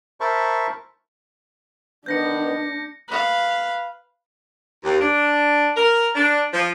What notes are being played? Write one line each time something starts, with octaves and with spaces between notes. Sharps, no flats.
A#4 C5 E5 A5 B5 C#6
D#3 B3 D4 B4 G6 A#6 C#7
B4 F5
D#2
D4
A#4
D4
F3